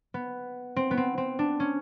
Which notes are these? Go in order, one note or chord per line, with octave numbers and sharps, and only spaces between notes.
B3
C4
B3
C4
C4
D4
C#4